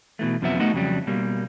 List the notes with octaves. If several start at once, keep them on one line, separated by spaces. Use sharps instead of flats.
B2 E3 A3
F#2 C3 F3 F#3 B3 E5
A3 B3 D#4 F#4
F2 C#3 F#3 G3
B2 G3 A#3